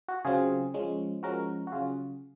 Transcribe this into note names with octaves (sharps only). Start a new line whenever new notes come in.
F#4
C#3 F#3 C4 F4 G#4
F3 G#3 C#4
F3 G#3 C#4 F#4 A#4
F#4
C#3 F#3 C#4 F4 G#4